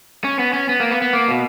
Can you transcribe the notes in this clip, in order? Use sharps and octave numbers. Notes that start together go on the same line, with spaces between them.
C#4
B3
C#4
B3
A#3
B3
B3
A#3
B2